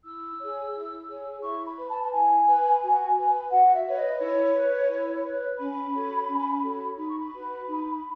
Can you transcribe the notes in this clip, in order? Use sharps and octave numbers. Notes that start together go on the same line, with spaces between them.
E4 E6
G#4 C#5
E4
G#4 C#5
E4 C#6
B5
B4
A5
A5
E4 G#5
B4
F#4
B4
F#4 F#5
E5
B4 C#5
D#5
E4 C#5
B4
E4
B4
C#4 B5
F#4 A4 C#5
C#4
F#4 A4 C#5
D#4 B5
C#6
B5
F#4 B4
D#4